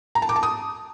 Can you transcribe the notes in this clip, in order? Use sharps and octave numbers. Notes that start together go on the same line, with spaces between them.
A#5
A5
D6
A5
D#6